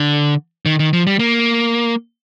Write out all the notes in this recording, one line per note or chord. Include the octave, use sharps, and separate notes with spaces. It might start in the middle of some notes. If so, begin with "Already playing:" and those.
Already playing: D3
D#3
D#3
F3
G3
A#3